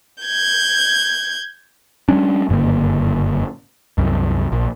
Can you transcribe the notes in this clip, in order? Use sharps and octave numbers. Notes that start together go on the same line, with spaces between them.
G6 G#6
G3 A3 C#4 D4
F#1 G2 D3 A#3
C2 F#2
A#1